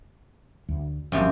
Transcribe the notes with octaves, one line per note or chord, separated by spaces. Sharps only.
D2
G1 F#2 C3 F3